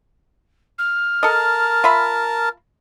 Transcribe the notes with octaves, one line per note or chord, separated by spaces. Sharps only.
F6
A4 A#4 D#5 A5
F4 E5 B5